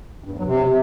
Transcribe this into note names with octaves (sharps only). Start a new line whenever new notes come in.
G2
E2
F#3
C3